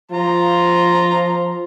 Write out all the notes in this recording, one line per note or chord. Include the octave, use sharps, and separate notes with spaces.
F3 F4 A#5